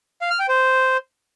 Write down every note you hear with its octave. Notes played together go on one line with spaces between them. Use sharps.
F5
F6
G5
C5